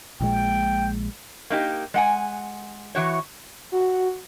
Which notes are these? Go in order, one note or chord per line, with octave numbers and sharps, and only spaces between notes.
A#1 A#2 G#3 G5
A#3 D#4 E4 G4
G#3 F#5 G#5
E3 F#4 C#5
F#4